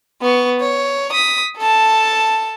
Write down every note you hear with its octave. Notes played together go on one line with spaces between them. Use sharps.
B3 C#6
C#5
D#6 B6
A4 A5